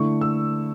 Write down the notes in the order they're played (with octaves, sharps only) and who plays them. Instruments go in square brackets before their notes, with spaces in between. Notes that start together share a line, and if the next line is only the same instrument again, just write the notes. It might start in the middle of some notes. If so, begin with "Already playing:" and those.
Already playing: [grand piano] D3 A3 E4 C#6
E6